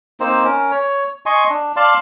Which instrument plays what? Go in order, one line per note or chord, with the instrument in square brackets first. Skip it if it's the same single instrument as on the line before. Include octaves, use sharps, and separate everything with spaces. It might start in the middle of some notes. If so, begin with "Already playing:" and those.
[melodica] A#3 C4 D#4 C5
C#4 A#4
C#5
D#5 G#5 C6 C#6
D4
D5 F5 A5 C6